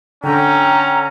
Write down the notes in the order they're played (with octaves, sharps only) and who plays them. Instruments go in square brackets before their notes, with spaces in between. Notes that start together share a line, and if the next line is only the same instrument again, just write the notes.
[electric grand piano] D3 [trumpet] C#4 [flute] G5 [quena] A#5